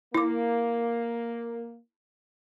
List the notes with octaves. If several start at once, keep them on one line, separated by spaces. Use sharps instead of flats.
A#3 E4 D6